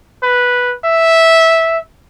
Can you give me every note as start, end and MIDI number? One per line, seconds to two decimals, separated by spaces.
0.23 0.74 71
0.85 1.79 76